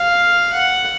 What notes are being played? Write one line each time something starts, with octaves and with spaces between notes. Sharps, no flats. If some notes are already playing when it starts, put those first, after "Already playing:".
Already playing: F5
F#5